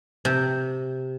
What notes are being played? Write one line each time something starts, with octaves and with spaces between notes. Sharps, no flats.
C3